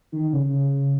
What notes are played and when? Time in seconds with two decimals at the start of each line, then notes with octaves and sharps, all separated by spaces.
0.12 D#3
0.33 C#3